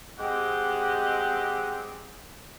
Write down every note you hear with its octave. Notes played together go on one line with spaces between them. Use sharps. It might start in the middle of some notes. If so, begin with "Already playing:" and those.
G#3 C4 G4 D#5 F#5